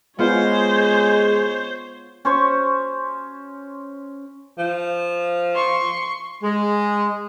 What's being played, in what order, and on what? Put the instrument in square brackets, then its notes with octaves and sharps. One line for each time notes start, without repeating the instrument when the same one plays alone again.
[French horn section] G#3 [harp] B3 F4 [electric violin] C5 C#5
[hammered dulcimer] C#4 C5 C#6
[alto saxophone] F3
[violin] C6 C#6
[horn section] G#3